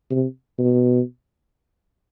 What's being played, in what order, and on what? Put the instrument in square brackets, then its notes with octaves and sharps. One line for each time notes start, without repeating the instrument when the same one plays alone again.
[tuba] C3
B2